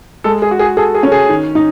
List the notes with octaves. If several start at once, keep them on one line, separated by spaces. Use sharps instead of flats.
G#3 A4
G#4
F#4
G#4
G#4 A4
G#4
C#4
G#4
D#3
D#4